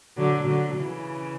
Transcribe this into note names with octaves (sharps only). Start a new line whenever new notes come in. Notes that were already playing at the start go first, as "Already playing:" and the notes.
D3 F#3
D3 F#3
C#3 E3